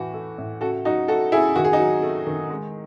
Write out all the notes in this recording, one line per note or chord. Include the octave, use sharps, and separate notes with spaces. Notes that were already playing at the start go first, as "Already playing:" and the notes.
Already playing: A2 E3 F#4
A3
A2
C#3 F#4 A4
F#3 D#4 F#4
A3 F#4 A4
C#3 E4 G#4
D#3 F#4
G#4
D#4 F#4
F#3
A3
D#3
G#3